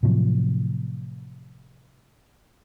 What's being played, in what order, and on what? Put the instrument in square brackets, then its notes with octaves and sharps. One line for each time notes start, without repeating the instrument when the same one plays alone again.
[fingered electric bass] A2 C3 F3 F#3